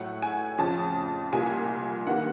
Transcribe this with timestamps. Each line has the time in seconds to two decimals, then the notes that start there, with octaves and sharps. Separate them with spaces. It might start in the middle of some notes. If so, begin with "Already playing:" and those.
Already playing: A2 F#3 A3 F#5
0.22 G#5
0.58 F2 C#3 F3 A5
1.32 C2 A#2 G3 A#3 G#5
2.06 G2 D#3 G3 A#3 F#5